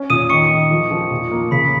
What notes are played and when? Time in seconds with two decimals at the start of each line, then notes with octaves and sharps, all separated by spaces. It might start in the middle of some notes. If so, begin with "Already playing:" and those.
Already playing: C#4
0.10 A#2 D#6 D#7
0.30 D#3 C#6 C#7
0.51 D#3
0.71 F3
0.91 F3
1.11 A#2
1.31 A#3
1.51 C#3 B5 B6